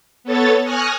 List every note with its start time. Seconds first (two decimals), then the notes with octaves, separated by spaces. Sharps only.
0.24 B3 A4 C#5 A6
0.64 G#5 C#6 D#6 F6 F#6 A#6